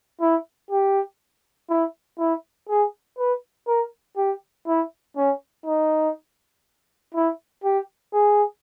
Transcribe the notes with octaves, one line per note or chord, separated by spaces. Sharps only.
E4
G4
E4
E4
G#4
B4
A#4
G4
E4
C#4
D#4
E4
G4
G#4